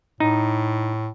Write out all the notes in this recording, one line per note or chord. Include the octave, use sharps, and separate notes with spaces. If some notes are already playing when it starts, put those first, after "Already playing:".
A2 D#4